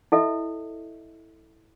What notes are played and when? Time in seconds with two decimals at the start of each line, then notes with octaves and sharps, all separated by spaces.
0.12 E4 A4 D#5 E5